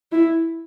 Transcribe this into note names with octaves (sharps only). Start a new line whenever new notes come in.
E4